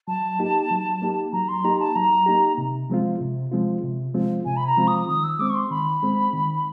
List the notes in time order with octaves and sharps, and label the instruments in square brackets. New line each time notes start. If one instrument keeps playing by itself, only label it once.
[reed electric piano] F#3 [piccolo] A5
[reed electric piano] A#3 D#4 G4
F#3
A#3 D#4 G4
[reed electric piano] F#3 [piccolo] A#5
[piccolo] C6
[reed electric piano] A#3 D#4 G4 [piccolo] A#5
[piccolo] A5
[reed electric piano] F#3 [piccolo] A#5
[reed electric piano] A#3 D#4 G4
C3
F3 G#3 C4 F4
C3
F3 G#3 C4 F4
C3
F3 G#3 C4 F4
[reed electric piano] C3 [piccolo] G#5
[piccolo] B5
A#5
[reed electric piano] F3 G#3 C4 F4
[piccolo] D#6
[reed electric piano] D#3 [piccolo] D#6
[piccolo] E6
[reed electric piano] G#3 C4 [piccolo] D6
[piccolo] C#6
C6
[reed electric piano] D#3 [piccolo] B5
[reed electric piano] G#3 C4
D#3